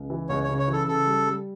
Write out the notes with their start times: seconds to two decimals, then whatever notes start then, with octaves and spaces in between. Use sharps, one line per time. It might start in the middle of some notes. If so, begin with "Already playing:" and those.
Already playing: C#2
0.10 E3
0.29 C#2 C#5
0.43 C#5
0.49 C#3
0.59 C#5
0.68 E3 A4
0.88 C#3 A4
1.07 G3
1.27 G3